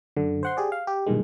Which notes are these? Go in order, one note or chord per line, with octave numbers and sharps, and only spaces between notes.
F#2 D3
C5 F#5 C6
G4 G#4 D5
F5
G4
B1 G2 A#2 D#3 G#3